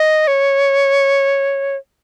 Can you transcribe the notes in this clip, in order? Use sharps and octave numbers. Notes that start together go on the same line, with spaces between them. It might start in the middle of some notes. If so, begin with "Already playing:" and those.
Already playing: D#5
C#5